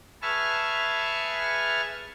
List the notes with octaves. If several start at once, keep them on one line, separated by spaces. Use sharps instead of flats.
G#4 B4 E5 A5 C#6 F6